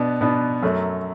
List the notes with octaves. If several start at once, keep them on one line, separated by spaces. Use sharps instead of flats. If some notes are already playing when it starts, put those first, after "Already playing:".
Already playing: B2 B3 D4
B2 B3 D4
F#2 F#3 A3